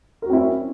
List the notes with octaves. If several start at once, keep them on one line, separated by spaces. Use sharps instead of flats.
C4 C#4 E4 F#4 A#4